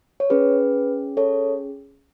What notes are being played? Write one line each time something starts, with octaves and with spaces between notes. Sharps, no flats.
C#5
C#4 G#4 B4
A4 C#5